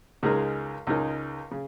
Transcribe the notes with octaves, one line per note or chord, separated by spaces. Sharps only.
C#2 C#3 G#3 D#4 A#4
C#2 C#3 G#3 D#4 A#4
C#3